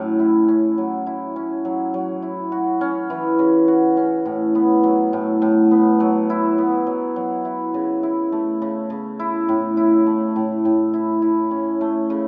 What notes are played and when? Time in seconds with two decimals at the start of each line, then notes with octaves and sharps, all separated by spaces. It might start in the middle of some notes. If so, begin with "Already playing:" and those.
Already playing: A2 F#3 C#4
0.19 E4
0.48 C#4
0.78 F#3
1.07 E4
1.36 C#4
1.65 F#3
1.94 F#3
2.22 E4
2.52 F#4
2.81 C#4
3.10 E3
3.39 C#3
3.68 F#4
3.97 C#4
4.26 A2
4.55 B3
4.83 F#3
5.13 A2
5.42 A2
5.71 B3
6.00 F#3
6.30 E4
6.58 B3
6.87 F#3
7.16 F#3
7.45 E4
7.74 C#3
8.03 E4
8.32 A3
8.62 C#3
8.90 C#3
9.19 E4
9.49 A2
9.77 E4
10.07 A3
10.36 A2
10.65 A2
10.94 E4
11.22 E4
11.51 C#4
11.81 A3
12.10 C#3